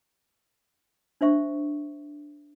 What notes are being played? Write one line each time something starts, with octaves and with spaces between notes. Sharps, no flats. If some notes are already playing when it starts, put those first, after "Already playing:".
D4 C5 E5 C#6